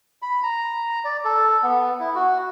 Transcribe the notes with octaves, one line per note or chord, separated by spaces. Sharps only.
B5
A#5
D5
A4
B3
E4
F#4